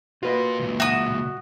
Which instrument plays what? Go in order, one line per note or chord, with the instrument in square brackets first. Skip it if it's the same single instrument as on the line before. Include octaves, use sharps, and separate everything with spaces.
[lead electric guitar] A#3 F4 [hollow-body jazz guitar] F#4 B4 D#5
[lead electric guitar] C#2 A#2
[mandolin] F#4 D#6 [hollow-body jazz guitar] E5